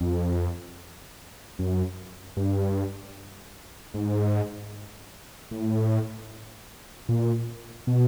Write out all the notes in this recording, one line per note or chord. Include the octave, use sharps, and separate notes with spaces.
F2
F#2
G2
G#2
A2
A#2
B2